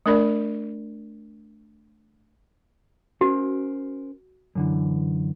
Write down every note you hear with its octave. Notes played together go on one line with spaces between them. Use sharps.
A3 D4 A#4 D5 B5
C#4 F#4 A#4 C5
F#2 D3 E3